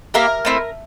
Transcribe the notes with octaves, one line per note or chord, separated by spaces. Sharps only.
A#3 E4 G4 A#4
A3 C4 E4